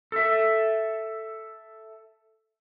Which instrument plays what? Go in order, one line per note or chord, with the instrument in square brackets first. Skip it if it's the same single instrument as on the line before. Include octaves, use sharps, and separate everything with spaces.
[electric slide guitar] A4 E5